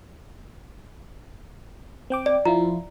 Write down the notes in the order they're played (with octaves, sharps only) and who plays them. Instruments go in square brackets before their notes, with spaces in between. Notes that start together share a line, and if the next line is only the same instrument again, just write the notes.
[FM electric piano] C4 G5 D6
[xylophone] D5
[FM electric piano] F3 E4 F4 [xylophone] A#5